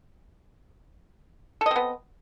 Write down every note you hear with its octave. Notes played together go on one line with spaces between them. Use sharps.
B3 C4 A4 D#5